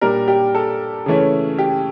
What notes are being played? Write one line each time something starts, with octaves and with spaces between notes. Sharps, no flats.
A#2 G3 D4 A#4
G4
A4
C#3 E3 A3 C#4
G4